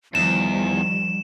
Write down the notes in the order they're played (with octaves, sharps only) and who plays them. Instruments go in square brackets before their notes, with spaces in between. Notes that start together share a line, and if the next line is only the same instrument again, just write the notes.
[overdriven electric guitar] E2 [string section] D#3 F3 [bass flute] G3 [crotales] E7